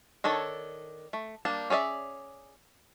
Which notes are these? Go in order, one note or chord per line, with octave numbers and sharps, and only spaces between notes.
D#3 D4 A4 C#5
A3
G3 A#3 D4 A5
C#4 G#4 D5 E5